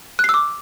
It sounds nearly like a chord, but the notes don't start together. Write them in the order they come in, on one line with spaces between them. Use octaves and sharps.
F#6 C7 E6 D6